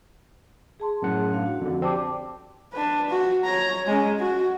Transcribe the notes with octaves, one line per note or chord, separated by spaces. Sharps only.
G#4 A5 C6
F#2 A2 F#5
D4 F5
F#4
F2 D3
C4 G4 D5 A5 D6
D4 B4
F#4
C#5 A#5
G#3 C#4
F#4